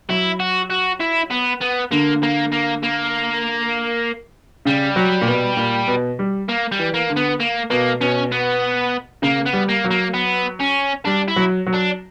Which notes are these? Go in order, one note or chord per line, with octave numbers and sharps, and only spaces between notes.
F#3 E4
F#4
F#4
E4
B3
B3
D3 A#3
A#3
A#3
A#3
C#3 G3
F#3
A#2
B2
A#2
B2
G3
A#3
G3
E3
A#3
D3
B3
A#3
B2 A#3
B2 C#4
B3
C#3 A#3
B3
G3
A#3
F#3
A#3
B3
C#4
G3 D4
E4
F#3
F#3
D4